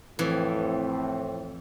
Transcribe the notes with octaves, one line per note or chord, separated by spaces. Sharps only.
F2 A2 E3 C4